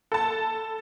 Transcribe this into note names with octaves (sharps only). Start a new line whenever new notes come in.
A4 A5